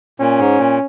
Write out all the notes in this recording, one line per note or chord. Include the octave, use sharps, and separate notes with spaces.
A#2 C#4
G#2
A#2